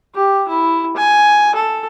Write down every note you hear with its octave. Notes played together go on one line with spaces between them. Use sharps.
G4
E4
G#5
A4